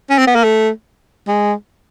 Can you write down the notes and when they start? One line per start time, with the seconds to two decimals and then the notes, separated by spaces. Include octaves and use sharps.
0.10 C#4
0.18 C4
0.27 B3
0.35 A#3
0.44 A3
1.28 G#3